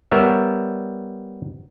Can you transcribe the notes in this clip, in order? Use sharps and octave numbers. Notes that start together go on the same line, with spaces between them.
G3 B3 A#4 C#5 E5